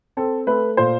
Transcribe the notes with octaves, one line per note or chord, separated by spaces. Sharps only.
C4 A4
A3 B4
A#2 C5